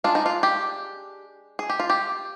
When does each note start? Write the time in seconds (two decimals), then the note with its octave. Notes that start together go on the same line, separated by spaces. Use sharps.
0.04 G#3 D4 F4
0.15 D#4
0.26 F4
0.43 G4
1.59 G#4
1.69 G4
1.80 F4
1.90 G4